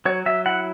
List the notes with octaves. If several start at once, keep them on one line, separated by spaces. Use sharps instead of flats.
F#3 C#5
F#3 E5
E4 F#5